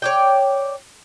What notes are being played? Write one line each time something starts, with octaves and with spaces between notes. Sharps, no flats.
C#5 D5 G5